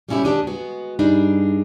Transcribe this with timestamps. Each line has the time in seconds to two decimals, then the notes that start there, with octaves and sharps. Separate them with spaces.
0.09 G3 A3 C#4 D#4 E4 G4
0.23 D#2 G#2 D4 G4 D#5 A5
0.47 G#3 B3 F#4
0.99 G2 G3 D4 D#4 G#4